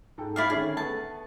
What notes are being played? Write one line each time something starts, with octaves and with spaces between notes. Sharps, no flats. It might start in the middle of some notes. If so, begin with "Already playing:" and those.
G#2 A4 G5
E4 D5 F5
D3 D#3 C#4 G#4
A3 B3 A5